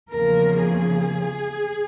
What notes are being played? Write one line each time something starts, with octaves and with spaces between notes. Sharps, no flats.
E2 C#3 F3 A#3 A#4
G#4